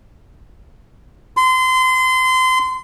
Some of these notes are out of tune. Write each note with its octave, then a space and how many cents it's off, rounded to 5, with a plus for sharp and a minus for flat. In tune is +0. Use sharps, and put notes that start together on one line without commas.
C6 -30